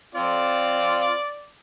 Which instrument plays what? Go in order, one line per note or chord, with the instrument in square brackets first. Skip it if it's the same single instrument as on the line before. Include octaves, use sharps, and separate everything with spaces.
[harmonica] C4 F4 [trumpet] D5